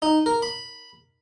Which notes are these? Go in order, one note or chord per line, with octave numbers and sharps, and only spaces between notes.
D#4
A#4
B5